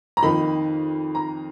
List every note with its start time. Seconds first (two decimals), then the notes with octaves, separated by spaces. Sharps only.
0.17 A#5
0.22 F2 D#3 A#3 D#4 B5
1.15 A#5